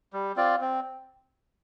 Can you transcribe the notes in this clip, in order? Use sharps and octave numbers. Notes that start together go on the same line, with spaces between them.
G3
C4 F4 D5
C4